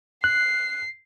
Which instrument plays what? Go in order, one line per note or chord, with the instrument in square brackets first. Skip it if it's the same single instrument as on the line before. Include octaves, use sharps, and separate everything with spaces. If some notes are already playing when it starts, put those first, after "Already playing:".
[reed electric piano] F#6 [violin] C7